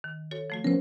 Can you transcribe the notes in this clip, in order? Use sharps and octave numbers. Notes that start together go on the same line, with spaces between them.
D#3
F#4 A4 C#5
F3 A3 F#4
F3 B3 C#4 A#4 C5